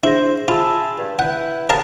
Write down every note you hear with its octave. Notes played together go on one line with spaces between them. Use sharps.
D4 E4 G#4 C5 A#6
F4 G#4 E5 A5 B5 E6
G2
E4 B4 F#5 G6
C#3 G4 A#4 B4 F5 A5 D#6